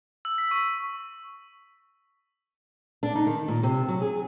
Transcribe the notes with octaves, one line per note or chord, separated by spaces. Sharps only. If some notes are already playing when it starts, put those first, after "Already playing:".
E6
B6
C#6
D4
D#4
D#3
A#2
C3
F#3
G#4